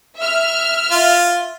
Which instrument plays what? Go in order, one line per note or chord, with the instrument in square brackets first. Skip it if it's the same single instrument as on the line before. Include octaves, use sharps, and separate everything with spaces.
[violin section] E5 F6
[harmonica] F4